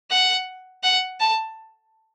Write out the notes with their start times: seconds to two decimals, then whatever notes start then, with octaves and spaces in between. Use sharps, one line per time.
0.11 F#5
0.84 F#5
1.20 A5